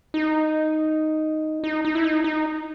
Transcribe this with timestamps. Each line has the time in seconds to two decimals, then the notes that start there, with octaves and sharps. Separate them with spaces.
0.14 D#4
1.64 D#4
1.85 D#4
1.95 E4
2.04 D#4
2.24 D#4